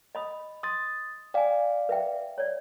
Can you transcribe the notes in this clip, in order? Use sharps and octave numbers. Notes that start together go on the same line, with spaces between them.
D#5 B5 D#6
C6 D#6 A6
D5 F5 G5 G#5
B4 E5 G5
C#5 D5